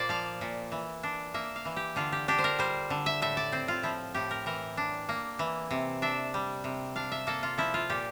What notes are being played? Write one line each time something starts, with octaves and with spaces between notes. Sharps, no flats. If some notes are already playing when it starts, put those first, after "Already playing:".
Already playing: A#2 A#3 C5 D5
F3 F5
A#2
E3
D4
A#3 E5
F5
E3
G4
D3 F4
G4
D4 G4
C5
A#4
G3 C5
D3
E5
A2 E5
D5
C4 C5
F4
F3 E4
A2 G4
A#4
E3 A#4
D4
A#3
E3
C3
D4 E5
G3
C3
D4 F5
E5
A#3 A4
F4
F3 E4
F4
A#2 G4